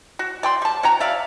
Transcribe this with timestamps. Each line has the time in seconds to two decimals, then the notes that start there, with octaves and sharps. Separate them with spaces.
0.19 F#4
0.43 D5 G5 C6
0.62 G3 A5
0.83 C#4 F#4 G5 A#5
1.00 D5 E5 F5